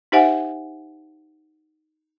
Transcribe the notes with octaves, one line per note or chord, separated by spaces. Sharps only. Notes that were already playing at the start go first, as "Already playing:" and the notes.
D#4 G4 C5 E5 F#5 G#5